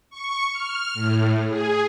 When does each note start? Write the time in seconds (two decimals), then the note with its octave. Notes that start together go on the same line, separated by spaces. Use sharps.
0.10 C#6
0.53 F6
0.94 A2
1.49 G#4